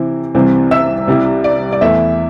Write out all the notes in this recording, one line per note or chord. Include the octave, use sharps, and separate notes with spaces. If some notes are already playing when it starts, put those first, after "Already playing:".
Already playing: C3 E3 C4 E4
C2 C3 E3 C4
E5 E6
C2 C3 G3 E4
D5
D5
E2 E3 A3 E4 E5